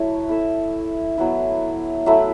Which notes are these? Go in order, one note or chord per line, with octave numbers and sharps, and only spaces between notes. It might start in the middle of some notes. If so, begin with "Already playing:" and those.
Already playing: F#3 A3 E4 C#5
E4 A4 E5
F#3 B3 E4
F#3 A3 E4